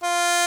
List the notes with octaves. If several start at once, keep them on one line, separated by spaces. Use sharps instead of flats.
F4